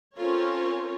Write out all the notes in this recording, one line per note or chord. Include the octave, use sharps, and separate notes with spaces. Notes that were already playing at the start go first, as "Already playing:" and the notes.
C4 C#4 F4 A4 A#4 C#5